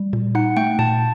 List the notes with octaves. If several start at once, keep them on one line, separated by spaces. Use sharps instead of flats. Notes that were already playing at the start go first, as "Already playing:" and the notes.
Already playing: G3
A#2
D#4 F#5
A3 G5
A#2 A5